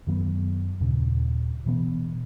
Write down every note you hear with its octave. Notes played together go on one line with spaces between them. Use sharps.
F#2 D#3 F#3 B3
D#2 A#2 C#3
B2 E3 B3